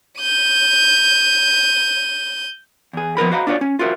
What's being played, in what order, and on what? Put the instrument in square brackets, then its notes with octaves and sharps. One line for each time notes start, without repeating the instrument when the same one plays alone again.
[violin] G6 D#7
[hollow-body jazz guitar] E2 G#4
F3 B3 A#4 B5
F#4 C5 D#5 F5 A#5 B5
D4 F4 F#4 A#4 C#5 D5
C#4
F4 F#4 A#4 C5 E5